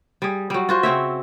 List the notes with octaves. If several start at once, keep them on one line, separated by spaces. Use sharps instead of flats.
G3 G#4
F#3 G3
F4 F#4 C5
C#3 C4 C#5 E5